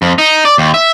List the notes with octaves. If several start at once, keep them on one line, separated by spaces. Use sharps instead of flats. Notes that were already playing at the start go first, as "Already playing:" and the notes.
F2
D#4
D5
D#2
E5